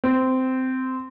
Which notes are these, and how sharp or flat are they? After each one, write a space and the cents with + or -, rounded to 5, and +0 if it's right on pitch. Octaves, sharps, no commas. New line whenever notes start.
C4 -15